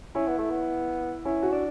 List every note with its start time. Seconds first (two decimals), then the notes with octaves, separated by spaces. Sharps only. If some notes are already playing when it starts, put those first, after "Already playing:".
0.15 C#4 E4
0.27 B3
0.39 A3
0.50 B3
1.25 C#4 E4
1.43 F#4
1.52 D4